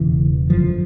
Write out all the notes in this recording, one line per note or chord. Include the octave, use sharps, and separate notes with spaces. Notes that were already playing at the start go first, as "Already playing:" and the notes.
Already playing: E1 C#3 E3
G#1 F#2 D3 F3